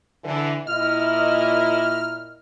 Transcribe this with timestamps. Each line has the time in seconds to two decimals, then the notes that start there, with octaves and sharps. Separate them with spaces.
0.24 D3 E3
0.67 A#2 E4 D#5 F6